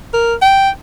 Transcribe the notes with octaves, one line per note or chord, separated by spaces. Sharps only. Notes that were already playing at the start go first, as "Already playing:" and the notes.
A#4
G5